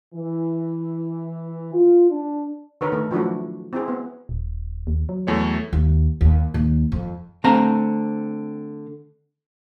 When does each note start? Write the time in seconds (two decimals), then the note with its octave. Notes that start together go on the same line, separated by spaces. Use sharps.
0.14 E3
1.74 F4
2.10 D4
2.81 D3 D#3 A#4 B4 C#5
2.92 D#3 A3
3.11 F3 F#3 A3 D4 E4 F#4
3.73 C4 E4 G#4
3.88 B3
4.29 D#1
4.87 D#2
5.09 F#3
5.27 E2 A3 C#5
5.73 D#2
6.21 D#2
6.54 D#2
6.92 F2
7.44 D3 A3 C4 F5 A#5